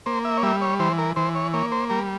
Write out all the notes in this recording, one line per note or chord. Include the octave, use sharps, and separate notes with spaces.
A#3 C5
E5
C#5
G3 E5
C#5
E3 C5
A#4
E3 C5
C#5
A#3 C#5
C5
G3 A#4